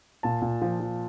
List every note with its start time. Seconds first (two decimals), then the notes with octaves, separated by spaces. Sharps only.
0.23 A#2 A5
0.42 A#2
0.62 F3
0.80 F3